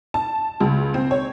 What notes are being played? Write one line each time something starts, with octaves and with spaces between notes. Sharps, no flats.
A5
C#2
C4
C#5